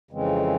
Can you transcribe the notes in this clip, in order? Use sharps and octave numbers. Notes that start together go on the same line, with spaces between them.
F2 C#3 E3 G#3 C4